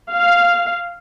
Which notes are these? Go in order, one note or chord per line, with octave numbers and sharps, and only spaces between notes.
F5